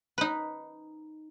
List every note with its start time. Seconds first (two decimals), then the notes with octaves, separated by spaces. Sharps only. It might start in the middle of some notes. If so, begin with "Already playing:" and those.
0.18 D#4 B4